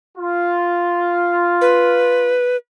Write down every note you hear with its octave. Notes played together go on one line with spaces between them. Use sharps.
F4
B4